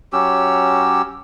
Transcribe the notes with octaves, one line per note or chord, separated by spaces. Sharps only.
F#3 C#4 G4 E6